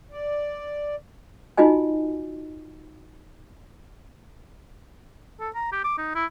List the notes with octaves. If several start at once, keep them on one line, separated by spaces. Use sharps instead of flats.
D5
D#4 F4 F#4 D#5 G#5
A4
A#5
G4
D6
D#4
E4